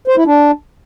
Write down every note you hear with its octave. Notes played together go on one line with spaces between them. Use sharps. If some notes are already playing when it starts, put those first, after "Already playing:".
C5
E4
D4